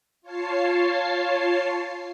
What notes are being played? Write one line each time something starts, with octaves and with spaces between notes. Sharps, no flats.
F4 C#5 A5 C7